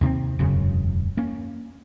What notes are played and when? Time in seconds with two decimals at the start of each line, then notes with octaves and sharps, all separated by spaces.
0.01 D#2 C3 A#3 C4
0.39 E1 F#2 C#3
1.17 A#3 C#4